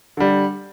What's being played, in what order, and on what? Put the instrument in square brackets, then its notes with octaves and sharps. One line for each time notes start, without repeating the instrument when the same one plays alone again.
[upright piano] D3 G3